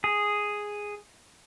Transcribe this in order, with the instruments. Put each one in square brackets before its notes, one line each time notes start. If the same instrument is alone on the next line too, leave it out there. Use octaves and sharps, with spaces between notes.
[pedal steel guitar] G#4